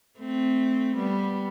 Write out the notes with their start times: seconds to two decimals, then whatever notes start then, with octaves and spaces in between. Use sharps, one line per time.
0.20 A3 C4
0.97 G3 B3